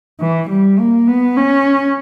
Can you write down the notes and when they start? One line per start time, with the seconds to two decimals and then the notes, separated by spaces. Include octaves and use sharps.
0.20 E3
0.50 G3
0.79 A#3
1.07 B3
1.36 C#4